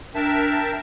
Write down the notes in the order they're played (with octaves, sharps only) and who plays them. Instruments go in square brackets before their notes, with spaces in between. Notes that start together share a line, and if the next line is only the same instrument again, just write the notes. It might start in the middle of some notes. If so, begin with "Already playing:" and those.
[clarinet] D4 [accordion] A#4 E5 A5 [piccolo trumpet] G5